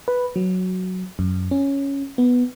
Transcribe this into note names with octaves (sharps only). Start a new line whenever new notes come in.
B4
F#3
F#2
C#4
B3